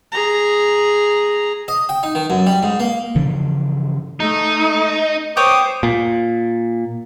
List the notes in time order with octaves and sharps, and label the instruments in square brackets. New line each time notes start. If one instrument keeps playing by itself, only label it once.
[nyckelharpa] G#4 A#5
[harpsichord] D#5
G5
D#4
D#3
F#2
G3
G#2
A#3
[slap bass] G2 C#3 E3 F3
[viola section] A3 [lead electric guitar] D#4
[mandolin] B3 C#5 G5 [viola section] C5 [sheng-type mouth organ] D6 D#6
[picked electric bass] A#2